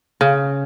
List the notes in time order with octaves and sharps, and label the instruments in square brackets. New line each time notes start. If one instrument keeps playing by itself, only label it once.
[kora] C#3